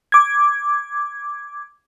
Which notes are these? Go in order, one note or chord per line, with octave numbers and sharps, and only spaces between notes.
D6 G#6